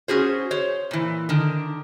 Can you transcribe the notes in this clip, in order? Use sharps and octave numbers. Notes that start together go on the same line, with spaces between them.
C#4 F#4 G#4 C5
C5 C#5
A#2 E3
D3 D#3